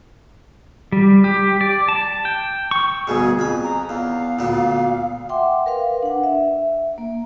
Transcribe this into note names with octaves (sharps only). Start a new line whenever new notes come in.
G3
G4
D5
A5
G5
C#6
D2 G2 B2 G#4
F2 B5
A#5
E2 F5
D2 A#2 B3
E5 F#5 G5 C6 D6
A#4 B4 F5
D4 F#5
E5
A#3